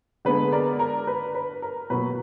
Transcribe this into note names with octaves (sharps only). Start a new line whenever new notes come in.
D3 G#3 B3 B4
A#4 D5
A#4
B4
B4
A#4
B2 F#3 A#3 B4